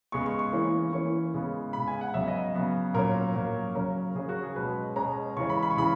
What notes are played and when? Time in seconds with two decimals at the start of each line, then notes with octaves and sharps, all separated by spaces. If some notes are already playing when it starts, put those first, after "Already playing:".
0.12 C#3 G#3 B3 C#6
0.26 C#6
0.39 C#6
0.53 E3 A#3 C#4
0.93 E3 A#3 C#4 C#6
1.34 C#3 G#3 B3
1.73 C#3 G#3 B3 B5
1.88 G#5
2.01 F#5
2.14 C#3 F#3 B3 E5
2.28 D#5
2.55 C#3 F#3 B3
2.94 A#2 F#3 A#3 C#4 A#4
3.35 A#2 F#3 A#3 C#4
3.75 C#3 F#3 C#4 A#4
4.15 C#3 F#3 C#4 G#4
4.29 F#4
4.43 G#4
4.56 B2 G#3 C#4 B4
4.96 B2 G#3 C#4 A#5
5.37 C#3 E3 G#3 C#4 C#6
5.50 B5
5.63 B5
5.71 C#6
5.77 C#3 E3 G#3 B5